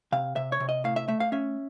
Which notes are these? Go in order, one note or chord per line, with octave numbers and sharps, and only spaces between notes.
C3 F5
C3 E5
C#5
C3
D#5
A2 F5
E5
A3 E5
F5
C#4 E5